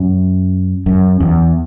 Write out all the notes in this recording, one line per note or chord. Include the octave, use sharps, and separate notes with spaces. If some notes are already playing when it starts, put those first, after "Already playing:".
Already playing: F#2
F#2
E2